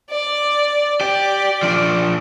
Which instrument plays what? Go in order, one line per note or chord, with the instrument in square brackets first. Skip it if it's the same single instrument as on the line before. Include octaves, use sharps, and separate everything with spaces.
[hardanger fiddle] D5
[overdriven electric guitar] G4 [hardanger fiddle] D5
[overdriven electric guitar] F3 D4